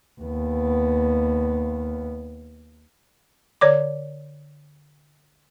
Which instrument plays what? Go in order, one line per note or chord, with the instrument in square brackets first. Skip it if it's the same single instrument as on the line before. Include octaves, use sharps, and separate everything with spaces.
[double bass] D#2 B3
[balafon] D3 C#5 D5 D6